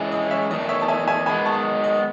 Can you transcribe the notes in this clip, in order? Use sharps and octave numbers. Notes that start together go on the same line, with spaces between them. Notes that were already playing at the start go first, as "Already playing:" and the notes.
Already playing: E3 G#3 C#4 E4
D#5
C#5 E5
E2 D#3 A3 D#5
C#5 E5
A5
E5 G#5
E5 G#5
D#3 G#3 B3 G#5 B5
A5 C#6
D#5